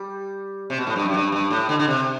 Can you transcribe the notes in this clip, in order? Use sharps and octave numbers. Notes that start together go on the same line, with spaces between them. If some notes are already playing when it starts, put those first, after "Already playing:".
Already playing: G3
C3
B2
A2
G2
F#2
G2
G2
A2
D3
D3
C3